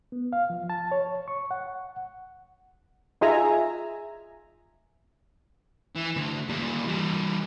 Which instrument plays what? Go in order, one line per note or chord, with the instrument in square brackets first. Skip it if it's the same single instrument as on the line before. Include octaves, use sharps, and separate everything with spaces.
[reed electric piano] B3
F5
F3
A5
C#5
C#6
F#5
[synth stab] D#4 F4 G#4 E5 G#5 A#5
[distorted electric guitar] E3
D2 D3
A#2 G3
E3 G3